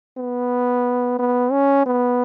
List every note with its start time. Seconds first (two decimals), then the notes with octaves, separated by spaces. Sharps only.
0.18 B3
1.19 B3
1.52 C#4
1.86 B3